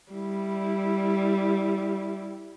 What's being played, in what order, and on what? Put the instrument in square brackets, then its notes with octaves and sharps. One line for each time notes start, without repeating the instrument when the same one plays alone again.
[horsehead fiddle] G3 E4